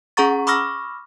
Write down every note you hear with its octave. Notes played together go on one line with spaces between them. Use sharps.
C#4 G#4 F#5 A#5 C#6 A6
B5 C#6 D6 E6 F6 A#6